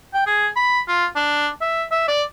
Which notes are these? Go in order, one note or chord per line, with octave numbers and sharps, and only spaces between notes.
G5
G#4
B5
F4
D4
E5
E5
D5